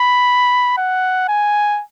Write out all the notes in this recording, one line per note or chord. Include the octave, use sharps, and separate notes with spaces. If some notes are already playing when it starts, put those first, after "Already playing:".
Already playing: B5
F#5
G#5